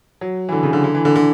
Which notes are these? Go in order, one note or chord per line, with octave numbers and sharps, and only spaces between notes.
F#3
E3
D3
C#3
D3
D3
E3
D3
D3